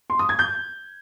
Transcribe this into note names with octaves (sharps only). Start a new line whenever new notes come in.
C6
D#6
G#6
G6